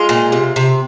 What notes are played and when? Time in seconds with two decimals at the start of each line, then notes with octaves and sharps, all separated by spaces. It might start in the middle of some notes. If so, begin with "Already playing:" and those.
Already playing: G#3 F4
0.09 A#2
0.32 C3
0.56 C3